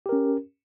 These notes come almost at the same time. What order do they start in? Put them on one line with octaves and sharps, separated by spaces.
G4 A#4 C#4